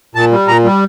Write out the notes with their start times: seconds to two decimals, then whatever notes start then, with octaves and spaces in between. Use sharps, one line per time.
0.15 A#2 A5
0.32 G3
0.47 A#2 A#5
0.64 G3